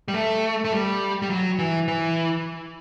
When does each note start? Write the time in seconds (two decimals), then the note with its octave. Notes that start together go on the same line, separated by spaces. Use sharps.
0.08 G3
0.14 A3
0.65 A3
0.72 G3
1.22 G3
1.30 F#3
1.59 E3
1.88 E3